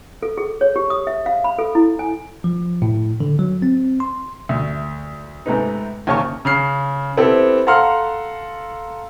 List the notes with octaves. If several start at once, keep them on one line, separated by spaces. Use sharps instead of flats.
A4
G#4
C#5
G4
D#6
E5
F5
B5
A4
E4
G#5
F3
A2
D3
F#3
C4
C6
D2
G#2 C3 A3 B3 D#4
D#2 C#3 A#4 C#5 A5 C#6
C#3 F6 C7
B3 C4 E4 G4 A4
A4 F5 F#5 A#5 C6 F6